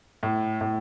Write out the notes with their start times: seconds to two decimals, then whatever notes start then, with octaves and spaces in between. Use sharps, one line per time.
0.23 A2
0.61 A2